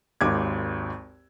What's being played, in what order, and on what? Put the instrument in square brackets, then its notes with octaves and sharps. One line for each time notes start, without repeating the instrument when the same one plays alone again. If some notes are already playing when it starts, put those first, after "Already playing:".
[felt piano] G#1 D#2 D6 G#6